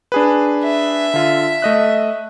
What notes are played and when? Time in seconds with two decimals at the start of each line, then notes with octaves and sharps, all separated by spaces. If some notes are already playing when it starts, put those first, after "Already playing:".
0.12 D4 G#4 B4
0.64 E5
1.14 D3 F4
1.62 A3 D#5 F#6